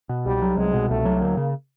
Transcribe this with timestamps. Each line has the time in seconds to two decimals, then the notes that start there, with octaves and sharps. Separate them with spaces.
0.09 B2
0.26 C2 G3
0.42 F#3
0.57 C2 G#3
0.74 B2
0.90 C2 A3
1.05 F#3
1.21 D2 A#3
1.37 C#3